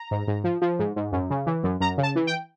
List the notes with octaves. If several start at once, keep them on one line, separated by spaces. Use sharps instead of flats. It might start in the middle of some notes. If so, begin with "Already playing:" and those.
Already playing: A#5
G#2
G#2
F3
F3
G#2
G#2
F#2
C#3
E3
F#2
F#2 A#5
C#3
A5
E3
G5